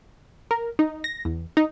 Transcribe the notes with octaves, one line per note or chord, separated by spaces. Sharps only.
A#4
D#4
A#6
E2
D#4